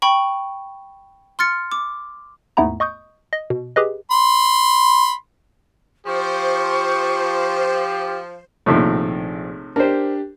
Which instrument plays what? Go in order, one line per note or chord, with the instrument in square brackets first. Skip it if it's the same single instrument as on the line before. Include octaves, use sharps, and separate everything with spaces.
[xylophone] G5 B5 C#6
C6 F6 A6 C#7
D6
[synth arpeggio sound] D#2 G#2 A3 B3 E4 A#5
D#5 C#6 D#6 G6
D#5
B2
G4 G#4 B4 D#5
[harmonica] B5 C6
[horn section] F3 [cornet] G4 [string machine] C5 [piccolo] C#6
[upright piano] A#1 F3 [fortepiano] A2 C3 D#3
[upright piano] D4 G4 [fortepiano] A#4 C5